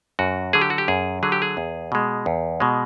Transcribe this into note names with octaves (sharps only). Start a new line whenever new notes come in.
F#2 F#4
D3 F#3 G#4
G4
F#4
G4
F#2 G#4
D3 F#3 G#4
G4
G#4
E2
B2 G#3
E2
B2 G#3